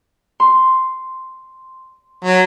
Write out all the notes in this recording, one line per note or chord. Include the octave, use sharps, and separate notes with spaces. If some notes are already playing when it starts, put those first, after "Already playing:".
C6
F#3